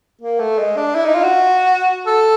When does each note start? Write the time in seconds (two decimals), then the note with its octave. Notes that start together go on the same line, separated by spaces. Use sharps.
0.22 A#3
0.40 A3
0.59 G#3
0.76 D4
0.95 E4
1.05 D#4
1.14 F4
1.23 F#4
2.07 A4